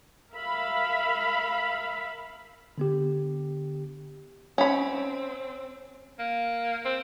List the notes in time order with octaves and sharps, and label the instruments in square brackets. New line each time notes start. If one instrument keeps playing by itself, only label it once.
[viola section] A#4 E5 F5 B5
[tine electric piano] D3 B3 G4
[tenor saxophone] C4 [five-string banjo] C#4 B5
[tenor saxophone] A#3
C4